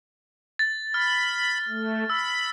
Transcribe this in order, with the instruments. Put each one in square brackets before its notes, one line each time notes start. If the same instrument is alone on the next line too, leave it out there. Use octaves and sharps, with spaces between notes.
[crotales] A6
[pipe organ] B5 [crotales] F6
[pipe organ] A3
[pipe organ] B5 [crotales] E6